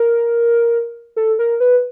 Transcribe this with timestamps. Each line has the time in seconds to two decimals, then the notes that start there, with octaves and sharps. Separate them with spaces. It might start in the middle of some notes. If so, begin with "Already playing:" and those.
Already playing: A#4
1.16 A4
1.39 A#4
1.60 B4